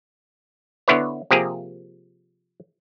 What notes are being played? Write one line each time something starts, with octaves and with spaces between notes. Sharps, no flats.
D3 B3 E4 B4 C#5
C3 F3 A#3 G4 G#4